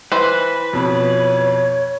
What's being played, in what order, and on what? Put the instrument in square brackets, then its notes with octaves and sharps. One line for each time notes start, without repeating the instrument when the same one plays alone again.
[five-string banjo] E3 C5 [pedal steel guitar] B4
[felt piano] F2 B2 [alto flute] C#5